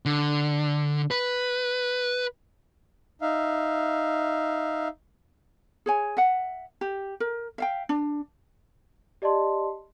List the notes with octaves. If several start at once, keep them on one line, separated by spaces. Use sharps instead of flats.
D3
B4
D#4 E5 F5
G#4 C#5 G#5
E5 F#5
G4
A#4
E5 F5 G5
D4
G4 D5 D#5 A5 C6